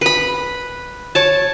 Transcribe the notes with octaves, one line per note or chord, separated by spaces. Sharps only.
B4 B5
C#5 A5